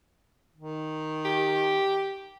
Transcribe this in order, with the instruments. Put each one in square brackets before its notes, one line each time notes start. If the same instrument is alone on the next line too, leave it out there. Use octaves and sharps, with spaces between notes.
[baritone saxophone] D#3
[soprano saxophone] G4